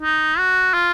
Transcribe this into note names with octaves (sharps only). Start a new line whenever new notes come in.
D#4
F#4
F4